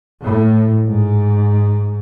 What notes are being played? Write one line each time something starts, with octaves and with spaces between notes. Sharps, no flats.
A2
G#2